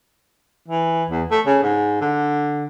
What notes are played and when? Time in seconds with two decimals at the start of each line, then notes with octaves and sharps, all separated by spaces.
0.68 E3
1.10 E2
1.31 A3
1.46 C#3
1.63 G#2
2.01 D3